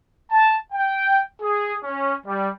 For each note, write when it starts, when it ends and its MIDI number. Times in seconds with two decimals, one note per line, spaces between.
0.31 0.56 81
0.72 1.20 79
1.42 1.74 68
1.84 2.12 61
2.25 2.49 55